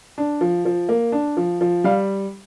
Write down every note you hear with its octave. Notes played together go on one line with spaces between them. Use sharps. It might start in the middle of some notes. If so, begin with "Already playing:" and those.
D4
F3
F3
A#3
D4
F3
F3
G3 F5